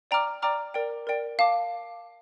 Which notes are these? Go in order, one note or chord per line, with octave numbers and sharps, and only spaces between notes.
D5 G5 A#5 D6 F6
D5 G5 A#5 D6 F6
A#4 D5 G5
A#4 D5 G5
F5 A5 D6